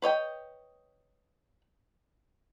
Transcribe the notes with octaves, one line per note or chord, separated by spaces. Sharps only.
B4 C#5 D#5 G5